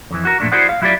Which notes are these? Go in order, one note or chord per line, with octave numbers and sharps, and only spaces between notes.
F2 E3
F#4 A#4
F2 A#2 A3 D4
E4 F#4 G#4 C5 D5 F#5
F5
F#3 E4 F4 G4 D5